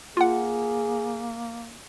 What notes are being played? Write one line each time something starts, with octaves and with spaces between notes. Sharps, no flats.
A#3 F4 G#4 F#5